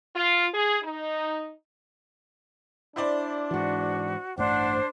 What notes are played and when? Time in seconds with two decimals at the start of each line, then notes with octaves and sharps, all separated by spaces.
0.15 F4
0.53 G#4
0.82 D#4
2.96 D4 E4 C5 D5
3.51 G#2 E3 F#4
4.38 A1 G2 A3 D4 C5 F#5